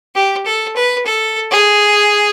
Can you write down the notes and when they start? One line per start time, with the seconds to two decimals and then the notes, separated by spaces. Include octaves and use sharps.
0.15 G4
0.46 A4
0.76 B4
1.06 A4
1.51 G#4